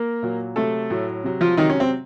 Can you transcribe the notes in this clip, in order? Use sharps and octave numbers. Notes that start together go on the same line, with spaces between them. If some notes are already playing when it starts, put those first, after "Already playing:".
Already playing: A#3 A#4
A#2 F#3
C3 F#3 A3 A4
A2 F#3
C3 F#3
F3 F4
C3 D#3 F#3 D#4
C#4
C4